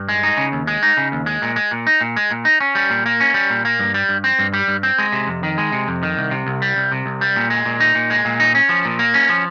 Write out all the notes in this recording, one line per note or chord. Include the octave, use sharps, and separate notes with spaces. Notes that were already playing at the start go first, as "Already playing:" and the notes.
Already playing: G2
G#3
D#4
C#3
D#2
G#3
D#4
C#3
D#2
G#3
A#2
G#3
A#2
D#4
A#2
G#3
A#2
D#4
C#4
G3
A#2
A#3
C#4
G3
A#2
A#3
G2
G3
G2
C4
G2
G3
G2
C4
G#3
C3
F2
D#3
G#3
C3
F2
D#3
C2
C3
C2
G3
C2
C3
C2
G3
A#2
G#3
A#2
D#4
A#2
G#3
A#2
D#4
C#4
F3
A#2
A#3
C#4
F3